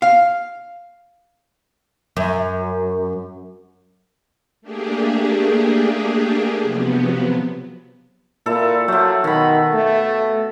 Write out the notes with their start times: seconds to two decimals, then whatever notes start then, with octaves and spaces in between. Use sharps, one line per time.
0.02 F5
2.17 F#2
4.62 A3 A#3 D4 G4 G#4
6.62 C3 F3 F#3 B3
8.46 A#2 E4 A4
8.88 F3 F#3 A3
9.24 B2 D#3 B5
9.74 A3